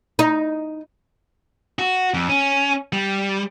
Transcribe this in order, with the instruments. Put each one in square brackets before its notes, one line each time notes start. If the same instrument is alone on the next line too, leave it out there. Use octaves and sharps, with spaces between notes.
[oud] D#4
[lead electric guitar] F#4
F2
C#4
G3